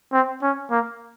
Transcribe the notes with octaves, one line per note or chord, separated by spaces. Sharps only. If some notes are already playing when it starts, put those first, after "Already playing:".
C4
C#4
A#3